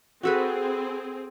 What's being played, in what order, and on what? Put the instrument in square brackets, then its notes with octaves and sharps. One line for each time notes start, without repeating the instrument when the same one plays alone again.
[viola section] C4 G#4 [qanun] F#4 A4 B4